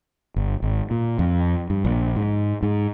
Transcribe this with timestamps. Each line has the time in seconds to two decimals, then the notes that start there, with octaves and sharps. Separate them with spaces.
0.36 G1
0.62 G#1
0.91 A#2
1.19 F2
1.70 G2
1.85 A#1
2.16 G#2
2.63 G#2